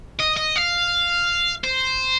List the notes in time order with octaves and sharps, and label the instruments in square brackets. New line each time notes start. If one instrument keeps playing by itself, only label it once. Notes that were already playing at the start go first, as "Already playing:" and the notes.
[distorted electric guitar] D#5
D#5
F5
C5